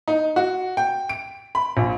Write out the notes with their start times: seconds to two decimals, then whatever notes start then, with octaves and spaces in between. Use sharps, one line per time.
0.08 D#4
0.36 F#4
0.77 G5
1.09 D7
1.55 B5
1.77 A#1